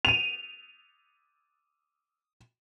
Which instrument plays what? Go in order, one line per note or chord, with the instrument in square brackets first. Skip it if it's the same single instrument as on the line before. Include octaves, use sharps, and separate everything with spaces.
[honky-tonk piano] D#7 F7